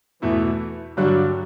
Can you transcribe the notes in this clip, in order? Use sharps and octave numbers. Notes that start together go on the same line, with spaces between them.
E2 B2 E3 A3 E4
G2 D3 F#3 G3 D4